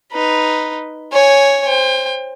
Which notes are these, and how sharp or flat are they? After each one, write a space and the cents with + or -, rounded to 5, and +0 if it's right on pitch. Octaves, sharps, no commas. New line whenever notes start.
D#4 +0 B4 +0
C#5 +0 G#5 -5
C5 +0 G5 +40